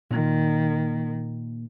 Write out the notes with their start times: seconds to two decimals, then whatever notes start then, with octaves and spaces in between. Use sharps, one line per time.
0.11 A#2 D#3 A#3